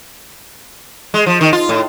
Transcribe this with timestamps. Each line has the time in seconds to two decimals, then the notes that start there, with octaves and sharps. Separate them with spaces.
1.14 G#3
1.26 F3
1.41 D#3
1.53 F4
1.69 A2